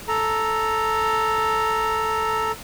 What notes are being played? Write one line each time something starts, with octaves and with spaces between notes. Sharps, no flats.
A4 A#5